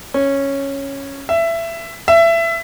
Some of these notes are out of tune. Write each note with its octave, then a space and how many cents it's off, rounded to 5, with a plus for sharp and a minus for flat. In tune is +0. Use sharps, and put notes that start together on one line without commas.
C#4 -5
E5 +20
E5 +25